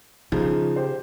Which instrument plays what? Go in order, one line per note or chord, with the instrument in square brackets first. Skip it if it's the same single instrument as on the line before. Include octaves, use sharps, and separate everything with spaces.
[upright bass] C#3 [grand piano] F3 D#4
[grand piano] G4 C5